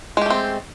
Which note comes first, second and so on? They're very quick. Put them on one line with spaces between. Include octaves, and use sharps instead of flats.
G#3 G4 A3 C4